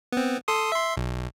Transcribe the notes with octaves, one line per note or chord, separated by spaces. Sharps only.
B3 C4
A4 C6 D#6
E5 C6
B1